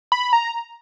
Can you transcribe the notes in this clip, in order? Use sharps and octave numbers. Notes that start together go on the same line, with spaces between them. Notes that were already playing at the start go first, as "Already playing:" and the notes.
B5
A#5